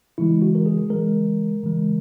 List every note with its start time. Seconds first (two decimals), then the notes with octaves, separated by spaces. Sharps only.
0.18 C#3 E3 G#3 E4
0.42 F#4
0.55 A#4
0.66 G#4
0.90 C#3 E3 G#3 A#4
1.64 C#3 E3 G#3